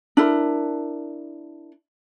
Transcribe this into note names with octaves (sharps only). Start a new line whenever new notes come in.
D4 E4 A#4